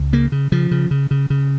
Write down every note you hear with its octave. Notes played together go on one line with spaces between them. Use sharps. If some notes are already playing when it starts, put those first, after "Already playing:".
Already playing: C#2
C#3 A#3
C#3
C#3 F3
C#3
C#3
C#3
C#3